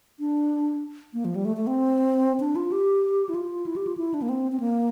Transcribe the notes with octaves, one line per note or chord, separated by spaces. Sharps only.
D4
A#3
F3
G3
A3
A3
C4
D4
F4
G4
E4
F4
E4
G4
F4
E4
D4
A#3
C4
C4
A#3